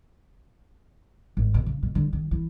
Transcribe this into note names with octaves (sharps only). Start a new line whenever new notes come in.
G#1
B2
C#3
B2
D3
D#3
E3